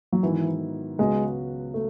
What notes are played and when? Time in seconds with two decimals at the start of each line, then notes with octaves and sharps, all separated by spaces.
0.12 F#3
0.23 G#2 D#3 E3 F#3 B3 E4
0.98 C#2 C#3 F#3 G#3 B3 F#4
1.74 A3